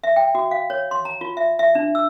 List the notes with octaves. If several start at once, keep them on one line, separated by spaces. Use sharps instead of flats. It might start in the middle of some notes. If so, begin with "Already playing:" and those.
E5
G5
F#4
F5
C#5
C6
A#5
F4
E5
E5
D4
E6